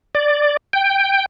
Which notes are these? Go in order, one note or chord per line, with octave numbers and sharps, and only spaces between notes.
D5
G5